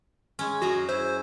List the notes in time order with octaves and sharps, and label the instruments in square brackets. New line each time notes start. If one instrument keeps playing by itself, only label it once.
[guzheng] G#3 C#4
[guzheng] F#2 G#4 A#5 [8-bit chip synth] F#4
[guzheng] E4 [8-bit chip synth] C5